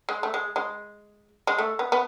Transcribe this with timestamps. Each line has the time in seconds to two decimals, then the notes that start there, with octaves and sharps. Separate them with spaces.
0.09 G#3
0.23 A3
0.34 G#3
0.56 G#3
1.47 G#3
1.58 A3
1.79 B3
1.92 B3